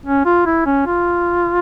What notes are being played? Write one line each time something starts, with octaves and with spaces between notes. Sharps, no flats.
C#4
F4
E4
C#4
F4